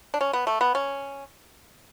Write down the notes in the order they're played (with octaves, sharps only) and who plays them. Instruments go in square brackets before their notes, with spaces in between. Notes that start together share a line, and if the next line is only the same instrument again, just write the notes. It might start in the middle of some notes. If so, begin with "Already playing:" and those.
[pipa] D4
C#4
B3
A3
B3
C#4